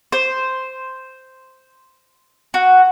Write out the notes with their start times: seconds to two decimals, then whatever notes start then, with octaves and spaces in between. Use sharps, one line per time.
0.12 C5
2.54 F#4